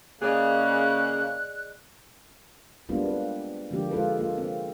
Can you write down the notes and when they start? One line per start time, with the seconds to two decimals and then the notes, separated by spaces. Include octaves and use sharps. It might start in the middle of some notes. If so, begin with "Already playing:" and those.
0.21 C#3 A#3 G#4 D5 D#5 F#6
2.89 G3 G#3 A#3 B3 D4 F4
3.06 C4 B4
3.71 D3 F3 G#3 A#3 D4 G4
3.91 G#3 F4 A4 B4
4.19 A#3 F4
4.38 C4